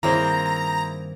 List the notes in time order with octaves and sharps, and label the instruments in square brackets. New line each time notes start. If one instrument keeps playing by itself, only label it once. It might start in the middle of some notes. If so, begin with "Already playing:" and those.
[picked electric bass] G2 D#3 [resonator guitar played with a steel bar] A#3 C4 [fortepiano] E4 G#4 C5 [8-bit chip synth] A#5